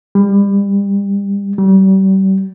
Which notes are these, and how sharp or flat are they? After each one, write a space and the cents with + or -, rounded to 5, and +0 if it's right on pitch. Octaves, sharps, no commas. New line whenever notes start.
G3 +30
G3 -35